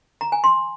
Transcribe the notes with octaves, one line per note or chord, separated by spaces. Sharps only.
A#5
G#5
C6